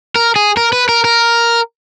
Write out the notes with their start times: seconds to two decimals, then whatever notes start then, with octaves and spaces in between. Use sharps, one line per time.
0.16 A#4
0.36 G#4
0.57 A#4
0.73 B4
0.89 A#4
1.04 A#4